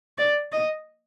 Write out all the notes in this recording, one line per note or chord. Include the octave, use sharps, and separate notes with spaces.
D5
D#5